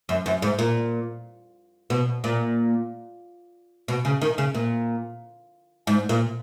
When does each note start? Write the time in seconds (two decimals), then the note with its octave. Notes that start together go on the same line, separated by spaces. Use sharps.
0.09 F#2
0.26 F#2
0.42 G#2
0.59 A#2
1.90 B2
2.24 A#2
3.88 B2
4.05 C#3
4.22 D#3
4.38 C#3
4.54 A#2
5.87 G#2
6.09 A#2